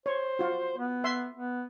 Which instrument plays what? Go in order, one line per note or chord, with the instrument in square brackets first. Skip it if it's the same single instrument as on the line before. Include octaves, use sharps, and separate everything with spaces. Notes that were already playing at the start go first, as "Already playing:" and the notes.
[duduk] C5 [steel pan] C#5
[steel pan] F4 F#4
[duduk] B3
[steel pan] E5 C6
[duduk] B3